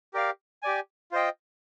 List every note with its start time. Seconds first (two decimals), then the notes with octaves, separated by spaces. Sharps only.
0.14 G4 A#4 D5 F5
0.63 G4 D5 G#5
1.12 F4 C5 D#5 G5